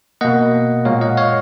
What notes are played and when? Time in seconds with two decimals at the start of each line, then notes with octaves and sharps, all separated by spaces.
0.21 B2 A#3 D#5 F#5
0.85 A#2 G#3 C#5 F5
1.01 D#5 F#5
1.17 C#5 F5